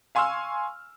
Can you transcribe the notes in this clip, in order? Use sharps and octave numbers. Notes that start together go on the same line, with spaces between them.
F5 G#5 C6 C#6 E6 F6